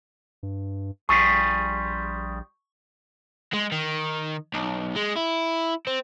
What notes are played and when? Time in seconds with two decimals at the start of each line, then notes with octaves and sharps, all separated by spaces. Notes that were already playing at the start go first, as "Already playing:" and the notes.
0.43 G2
1.09 A#1 G3 F4 G#4 C#6
3.54 G#3
3.72 D#3
4.54 B1
4.96 G#3
5.17 E4
5.87 C4